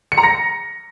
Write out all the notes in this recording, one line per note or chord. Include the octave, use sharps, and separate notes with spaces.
C#7
A#5
A#6